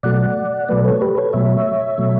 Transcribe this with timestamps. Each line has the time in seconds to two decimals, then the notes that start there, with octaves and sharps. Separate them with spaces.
0.03 B2 F#3 A3 D5 F#5
0.68 B2 F#3 A3 B4 D5
0.85 A4 C#5
1.01 G4 B4
1.17 A4 C#5
1.33 B2 F#3 A3 C#5 E5
1.98 B2 F#3 A3